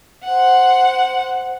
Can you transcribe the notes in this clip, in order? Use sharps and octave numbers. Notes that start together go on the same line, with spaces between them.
C5 F#5